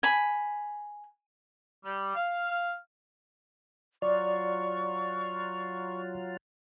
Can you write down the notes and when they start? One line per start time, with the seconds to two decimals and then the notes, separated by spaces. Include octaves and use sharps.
0.03 G#5 B5
1.85 G3
2.15 F5
4.02 F#3 F4 D5 C#6